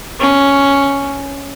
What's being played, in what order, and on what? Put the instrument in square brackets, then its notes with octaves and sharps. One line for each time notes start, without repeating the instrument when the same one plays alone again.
[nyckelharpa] C#4